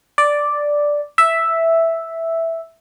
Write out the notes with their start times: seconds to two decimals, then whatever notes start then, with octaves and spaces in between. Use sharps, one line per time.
0.18 D5
1.18 E5